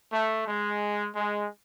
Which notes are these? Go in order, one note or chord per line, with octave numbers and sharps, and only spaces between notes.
A3
G#3
G#3